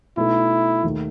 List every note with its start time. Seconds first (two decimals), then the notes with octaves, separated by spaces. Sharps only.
0.17 B2 A3 D#4 E4 A4
0.83 D#2 D#3 A3